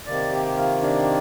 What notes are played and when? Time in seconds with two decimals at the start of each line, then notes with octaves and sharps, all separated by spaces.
0.06 C3 D#3 A#3 D5
0.32 G4
0.57 F4
0.82 D4